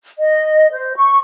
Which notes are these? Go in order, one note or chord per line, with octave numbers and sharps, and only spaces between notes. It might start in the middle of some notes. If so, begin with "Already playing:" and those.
D#5
C5
C#6